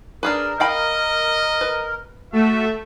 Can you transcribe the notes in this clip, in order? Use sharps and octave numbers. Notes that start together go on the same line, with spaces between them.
D4 G#4 A#4 B4
D#5 F5 G5 B5
B4
A3 F#4 E5